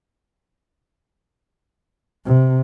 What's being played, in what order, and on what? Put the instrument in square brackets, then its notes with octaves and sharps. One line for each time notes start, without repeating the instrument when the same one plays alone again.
[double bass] C3